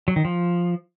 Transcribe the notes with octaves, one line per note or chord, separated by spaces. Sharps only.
F#3
D#3
F3